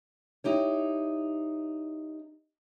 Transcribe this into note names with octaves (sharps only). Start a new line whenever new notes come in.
D#4 E4 G4 C#5